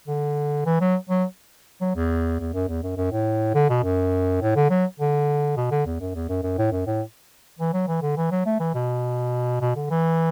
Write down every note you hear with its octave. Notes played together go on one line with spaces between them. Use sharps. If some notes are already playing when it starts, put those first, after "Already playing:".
D3
E3
F#3
F#3
F#3
E2
E2
F#2
E2
F#2
F#2
A2
D3
B2
F#2
A2
D3
F#3
D3
B2
D3
E2
F#2
E2
F#2
F#2
A2
F#2
A2
E3
F#3
E3
D3
E3
F#3
A3
E3
B2
B2
D3
E3